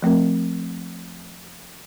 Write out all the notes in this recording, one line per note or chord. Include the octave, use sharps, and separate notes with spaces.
F3 A3 C4 A#4